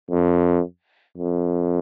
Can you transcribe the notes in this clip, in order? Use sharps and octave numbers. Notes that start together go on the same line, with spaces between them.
F2
F2